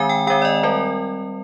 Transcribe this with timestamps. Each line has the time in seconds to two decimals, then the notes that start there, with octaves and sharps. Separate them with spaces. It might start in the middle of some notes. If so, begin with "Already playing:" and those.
Already playing: D#3 G#3 C4 G#5
0.09 G5
0.27 D#3 G#3 C4 G5
0.42 D5
0.45 D#5
0.63 G3 C4 A#4